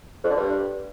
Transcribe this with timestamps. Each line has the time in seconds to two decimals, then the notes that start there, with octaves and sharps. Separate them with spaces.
0.23 F2
0.30 D3
0.37 G2